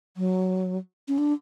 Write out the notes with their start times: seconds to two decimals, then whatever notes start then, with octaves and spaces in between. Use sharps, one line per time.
0.17 F#3
1.08 C#4
1.18 D4